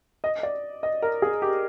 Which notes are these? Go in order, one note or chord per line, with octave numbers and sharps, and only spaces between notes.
D#5
D5
D#5
A#4
G#4
G4